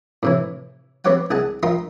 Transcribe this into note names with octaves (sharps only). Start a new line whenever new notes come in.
A2 C3 E3
B3 C4 G4 C#5 F#5 G5
C2 G#4 F#5 A5
F4 A#4 D#5 G5 C6